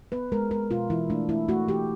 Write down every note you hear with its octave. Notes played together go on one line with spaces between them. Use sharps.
B3 B4
G#3 A#4
G#3 A#4
B2 F4
E3 E4
A3 D4
A3 E4
A3 F#4
E3 G4